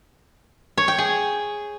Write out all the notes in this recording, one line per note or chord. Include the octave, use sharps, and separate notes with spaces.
C#5
G5
G#4